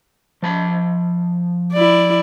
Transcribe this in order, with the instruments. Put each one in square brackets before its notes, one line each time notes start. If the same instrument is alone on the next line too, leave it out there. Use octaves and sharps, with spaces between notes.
[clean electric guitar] F3 A5 B5
[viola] E4 D5